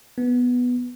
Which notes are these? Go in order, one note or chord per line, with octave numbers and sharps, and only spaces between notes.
B3